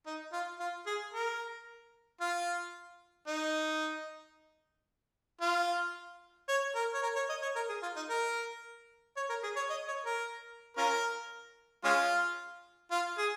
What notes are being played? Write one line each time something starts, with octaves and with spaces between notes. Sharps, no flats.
D#4
F4
F4
G#4
A#4
F4
D#4
F4
C#5
A#4
C#5
A#4
C#5
D#5
C#5
A#4
G#4
F4
D#4
A#4
C#5
A#4
G#4
C#5
D#5
C#5
A#4
C#4 F4 A#4
G#3 C#4 F4
F4
G#4